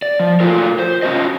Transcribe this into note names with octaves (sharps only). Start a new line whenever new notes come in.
D5
F3
A3 F4 A#4
C5
C#4 F4 F#4 D#5